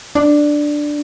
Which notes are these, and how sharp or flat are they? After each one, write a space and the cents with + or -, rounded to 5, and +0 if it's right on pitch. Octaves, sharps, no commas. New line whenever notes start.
D4 +5